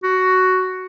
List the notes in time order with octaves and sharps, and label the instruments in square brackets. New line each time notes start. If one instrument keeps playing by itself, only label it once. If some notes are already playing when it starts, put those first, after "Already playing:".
[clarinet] F#4